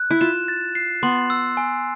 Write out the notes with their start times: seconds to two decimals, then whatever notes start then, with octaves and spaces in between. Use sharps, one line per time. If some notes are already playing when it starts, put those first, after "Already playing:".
Already playing: F#6
0.11 E4
0.21 F4 E7
0.48 A6
0.75 C7
1.03 B3 C6
1.30 E6
1.57 G#5